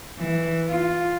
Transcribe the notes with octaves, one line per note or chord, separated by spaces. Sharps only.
E3
F4